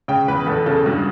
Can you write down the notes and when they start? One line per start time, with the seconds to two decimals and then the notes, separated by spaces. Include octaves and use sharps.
0.08 C#3 G5
0.28 E2 B4
0.47 E2 A4
0.66 C#3 A4
0.86 G2 F#4